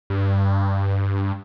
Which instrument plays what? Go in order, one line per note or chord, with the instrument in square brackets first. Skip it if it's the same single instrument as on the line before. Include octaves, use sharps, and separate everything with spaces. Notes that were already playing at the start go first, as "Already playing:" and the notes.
[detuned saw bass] G2